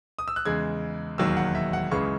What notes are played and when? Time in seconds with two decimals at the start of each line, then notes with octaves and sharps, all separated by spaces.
0.19 D#6
0.28 E6
0.36 F#6
0.45 E2 C#3 G#3 G#6
1.18 E1 D#2 D#3 F#3 E6
1.37 F#5
1.55 E5
1.73 F#5
1.91 C#2 C#3 E3 G#3 C#6